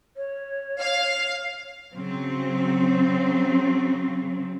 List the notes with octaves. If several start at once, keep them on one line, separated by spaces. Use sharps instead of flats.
C#5
F5
C#3 F#3 C4